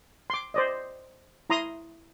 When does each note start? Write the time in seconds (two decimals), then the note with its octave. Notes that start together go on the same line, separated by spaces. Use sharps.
0.30 C6 D6
0.54 C5 D5 D#5
1.50 E4 A#5 C6 D#6